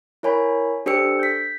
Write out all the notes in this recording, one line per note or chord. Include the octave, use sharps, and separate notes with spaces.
E4 A#4 C#5 G#5 B5
D4 G4 A4 C5 E6 C#7
G6 B6